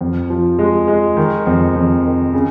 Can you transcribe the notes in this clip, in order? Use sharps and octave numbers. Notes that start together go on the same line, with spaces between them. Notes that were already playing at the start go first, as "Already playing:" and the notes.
F2
F3
G#3
G#3
D#3
F2
F2
D#3
C#3